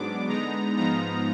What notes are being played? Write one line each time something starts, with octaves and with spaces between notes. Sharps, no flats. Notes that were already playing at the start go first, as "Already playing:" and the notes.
Already playing: G#2 F#3 B3 D4 D6
D3 G#3 B3 D#4 A#5
G#2 F3 B3 D#4 A#5